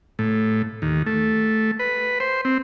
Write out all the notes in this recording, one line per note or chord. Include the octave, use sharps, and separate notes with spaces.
A2
D#2
A3
B4
C5
C4